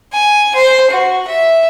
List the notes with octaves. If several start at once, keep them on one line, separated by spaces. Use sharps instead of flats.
G#5
C5
F#4
E5